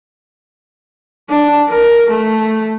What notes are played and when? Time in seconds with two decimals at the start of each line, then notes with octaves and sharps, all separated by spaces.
1.30 D4
1.70 A#4
2.10 A3